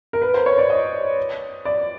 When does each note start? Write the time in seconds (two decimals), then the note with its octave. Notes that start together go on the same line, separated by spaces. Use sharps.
0.13 A#4
0.22 B4
0.34 C5
0.46 C#5
0.58 D5
0.70 D#5
1.65 D5